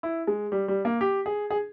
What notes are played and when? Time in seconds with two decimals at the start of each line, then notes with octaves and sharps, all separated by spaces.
0.03 E4
0.27 G#3
0.52 G3
0.68 G3
0.85 A#3
1.01 G4
1.26 G#4
1.50 G#4